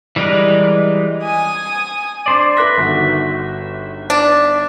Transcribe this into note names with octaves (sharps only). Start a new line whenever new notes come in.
E3 G3 G#3 A#4 B4
G#5 D#6
D4 C5 D5
B4 E5 F#6 A#6
G1 D#3 F#4
D4